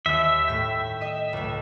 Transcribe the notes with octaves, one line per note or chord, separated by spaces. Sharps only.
D#2 E5
A2 G5
D#5
C#2 A2